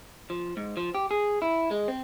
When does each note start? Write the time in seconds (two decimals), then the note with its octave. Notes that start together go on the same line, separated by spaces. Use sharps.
0.30 F3
0.57 G#2
0.77 F3
0.95 G4
1.11 G#4
1.42 E4
1.71 G#3
1.88 C4